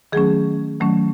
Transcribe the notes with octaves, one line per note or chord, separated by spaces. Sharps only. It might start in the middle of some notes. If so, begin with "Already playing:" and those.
D#3 F#3 A3 C#4 G#4
D#3 F#3 A3 C#4